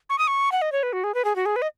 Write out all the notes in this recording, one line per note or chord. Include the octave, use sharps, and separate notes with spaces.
C#6
D#6
C#6
F#5
D#5
C#5
B4
F#4
G#4
B4
G#4
F#4
G#4
B4
D#5